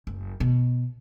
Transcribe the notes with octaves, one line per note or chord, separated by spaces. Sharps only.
F#1
B2